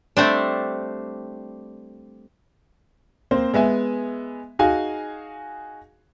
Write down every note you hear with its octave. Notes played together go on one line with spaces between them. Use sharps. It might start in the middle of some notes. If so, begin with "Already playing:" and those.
G3 A3 C4 D4
A#3 C4 C5
G#3 B3 E5 G#5
D#4 F#4 G#4 F5 G#5